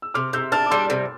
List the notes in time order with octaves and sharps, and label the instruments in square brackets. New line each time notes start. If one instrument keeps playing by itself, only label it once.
[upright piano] E6
[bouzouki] C3 [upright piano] D6 F6
[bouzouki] C3 [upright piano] E6 G6
[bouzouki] D4 [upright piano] F6 A6
[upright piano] D6
[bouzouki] G3 [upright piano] C6 E6
[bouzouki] C3